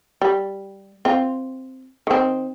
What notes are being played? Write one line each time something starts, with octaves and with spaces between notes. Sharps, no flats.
G3
C4 F4
D#3 C4